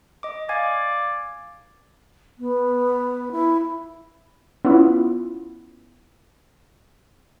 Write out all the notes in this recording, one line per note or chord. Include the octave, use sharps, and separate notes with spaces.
D#5 D6
D5 F5 G#5 G#6
B3
E4
B3 C#4 E4 F4